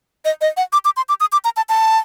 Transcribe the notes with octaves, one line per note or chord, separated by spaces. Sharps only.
D#5
D#5
F#5
D6
D6
C6
D6
D#6
D6
A#5
A5
A5